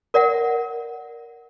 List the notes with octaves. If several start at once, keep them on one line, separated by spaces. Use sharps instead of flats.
A#4 D5 E5 F#5